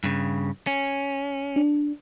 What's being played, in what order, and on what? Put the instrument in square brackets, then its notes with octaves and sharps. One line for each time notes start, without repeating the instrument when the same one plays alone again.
[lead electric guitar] G2 C#3
C#4
[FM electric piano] D4